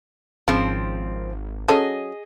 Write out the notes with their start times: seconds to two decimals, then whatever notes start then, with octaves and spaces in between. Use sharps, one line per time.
0.48 G#1 C#3 F3 C4
1.68 F#3 C#4 G#4 A4 D#5